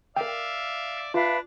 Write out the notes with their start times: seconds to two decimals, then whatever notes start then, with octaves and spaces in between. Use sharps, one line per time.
0.16 A#4 D5 E5 F5 G5
1.14 D4 F4 B4 E5 F5